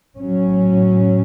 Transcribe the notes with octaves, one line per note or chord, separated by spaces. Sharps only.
A2 F#3 C#4